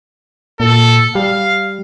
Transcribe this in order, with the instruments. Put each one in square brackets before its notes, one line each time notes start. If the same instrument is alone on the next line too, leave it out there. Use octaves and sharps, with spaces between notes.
[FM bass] A#2 [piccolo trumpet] A4
[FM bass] G3 [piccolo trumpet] F5